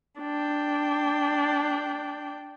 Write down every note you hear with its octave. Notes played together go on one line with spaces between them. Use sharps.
D4 G5